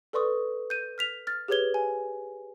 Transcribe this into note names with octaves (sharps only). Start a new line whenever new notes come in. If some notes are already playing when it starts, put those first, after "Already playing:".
A4 B4 D5 C6 C#6 D#6
G6 D#7
F6 B6 F7
F6 A6
G4 G#4 B4 C#5 G#6 G7
G#5